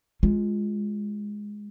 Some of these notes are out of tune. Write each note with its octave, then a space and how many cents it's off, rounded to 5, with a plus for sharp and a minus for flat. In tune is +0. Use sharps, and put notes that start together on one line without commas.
G#3 +0 F4 +0